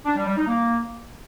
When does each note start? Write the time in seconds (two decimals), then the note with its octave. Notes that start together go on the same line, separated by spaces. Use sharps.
0.05 D4
0.16 G3
0.26 G3
0.37 D#4
0.47 A#3